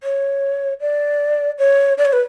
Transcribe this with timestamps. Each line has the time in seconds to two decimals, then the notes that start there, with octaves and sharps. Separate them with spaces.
0.03 C#5
0.81 D5
1.59 C#5
1.98 D5
2.05 C#5
2.13 B4